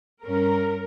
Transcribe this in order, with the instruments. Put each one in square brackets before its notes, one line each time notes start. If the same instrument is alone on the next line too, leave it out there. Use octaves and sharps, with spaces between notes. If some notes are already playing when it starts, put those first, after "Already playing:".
[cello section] G2 C#4 [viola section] A#4